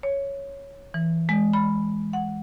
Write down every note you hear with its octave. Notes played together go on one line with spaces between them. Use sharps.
C#5
E3
G#3
B5
F#5